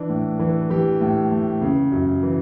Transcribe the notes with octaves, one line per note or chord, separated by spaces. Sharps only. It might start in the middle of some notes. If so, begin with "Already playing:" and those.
Already playing: E3 D4
A2
E3
E3 G4
A2
A2
C#3
F#2
E3